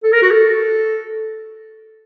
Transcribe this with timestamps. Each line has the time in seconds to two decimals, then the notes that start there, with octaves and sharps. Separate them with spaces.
0.04 A4
0.12 A#4
0.22 F#4
0.31 A4